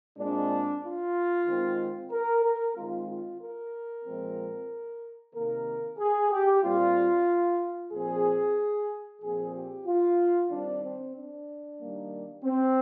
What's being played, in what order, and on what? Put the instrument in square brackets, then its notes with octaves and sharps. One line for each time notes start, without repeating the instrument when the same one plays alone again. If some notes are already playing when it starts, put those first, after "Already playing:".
[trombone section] A#2 G#3 C4 D4
F4
D#3 G#3 C4
A#4
A#4
D#3 G#3 C4 F4
F4
A#4
A#2 F3 G#3 C4
C3 D#3 A#3 A#4
G#4
G4
A#2 G3 C4 F4
A#2 F3 C4 G#4
A#2 F3 C4 G#4
G4
F4
D#3 G3 C4 D4
C4
D4
D#3 G3 A#3
C4